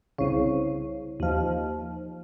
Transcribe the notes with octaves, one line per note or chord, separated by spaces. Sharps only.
C2 C#3
D#2 F3